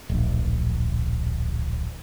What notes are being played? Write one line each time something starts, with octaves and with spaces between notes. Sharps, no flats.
D1 A#1